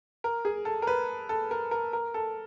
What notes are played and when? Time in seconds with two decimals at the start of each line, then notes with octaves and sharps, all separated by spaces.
0.24 A#4
0.45 G#4
0.65 A4
0.82 A#4
0.87 B4
1.29 A4
1.51 A#4
1.71 A#4
1.93 A#4
2.14 A4